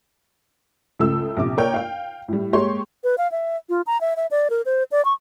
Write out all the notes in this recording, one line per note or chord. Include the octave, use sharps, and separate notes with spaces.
C#2 C#3 A3 A4 E6
A#1 C3 D6
A#3 A#4 C#5 D5 G5
F5 G5
A2 G3
G#3 A#3 G4 C#5 C6 C#6
B4
F5
E5
F4
A#5
E5
E5
D5
A#4
C5
D5
C#6